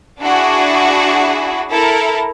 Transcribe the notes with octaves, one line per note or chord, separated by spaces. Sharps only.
D4 E4 F#4 G#4
E4 A4 A#4